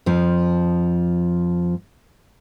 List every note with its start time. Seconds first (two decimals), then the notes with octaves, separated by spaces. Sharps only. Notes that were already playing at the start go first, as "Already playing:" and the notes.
0.06 F2 F3